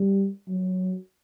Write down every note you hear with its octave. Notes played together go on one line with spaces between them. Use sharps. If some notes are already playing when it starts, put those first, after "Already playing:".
Already playing: G3
F#3